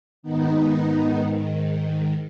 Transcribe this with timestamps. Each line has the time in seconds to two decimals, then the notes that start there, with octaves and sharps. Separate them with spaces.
0.23 G#2 D#3 B3 D#4